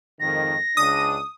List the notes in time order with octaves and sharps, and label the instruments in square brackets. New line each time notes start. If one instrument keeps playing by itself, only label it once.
[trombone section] F2 G#2 D#3 [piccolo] A#6
[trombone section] C#2 C#3 D4 [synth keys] D#6